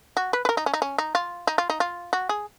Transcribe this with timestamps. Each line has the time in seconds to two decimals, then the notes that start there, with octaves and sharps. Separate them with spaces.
0.17 F#4
0.33 B4
0.45 B4
0.49 A#4
0.57 D#4
0.66 C#4
0.74 D#4
0.82 C#4
0.98 D#4
1.15 F4
1.47 D#4
1.58 F4
1.70 D#4
1.80 F4
2.13 F#4
2.29 G#4